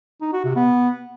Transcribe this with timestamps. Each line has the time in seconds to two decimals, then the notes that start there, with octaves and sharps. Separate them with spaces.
0.21 D#4
0.33 F#4
0.44 C3
0.56 B3